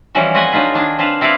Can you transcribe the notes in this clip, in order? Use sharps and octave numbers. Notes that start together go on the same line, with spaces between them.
E3 F3 G3 C#4 F#4
C4 F#4 B4 D#5 F#5 G#5
F#3 D4 D#4 F4 B4
D#3 D4 G#4
C4 D4 B4 F5 A5
C4 E4 B4 D5 F5